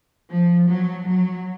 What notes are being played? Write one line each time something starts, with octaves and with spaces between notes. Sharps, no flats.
F3
F#3
F#3